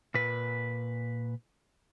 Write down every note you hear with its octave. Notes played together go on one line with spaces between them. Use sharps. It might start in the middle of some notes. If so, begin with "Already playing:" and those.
A#2 B4